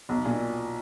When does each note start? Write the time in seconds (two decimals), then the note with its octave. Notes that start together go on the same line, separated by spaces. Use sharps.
0.09 B1
0.25 A#2